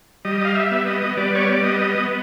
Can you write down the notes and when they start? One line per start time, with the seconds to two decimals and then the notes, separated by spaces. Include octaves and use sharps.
0.25 G3 D#5
0.45 F5
0.55 E5
0.71 B3
0.87 D#5
1.17 G3 D5
1.35 C#5
1.49 D5
1.63 B3 D#5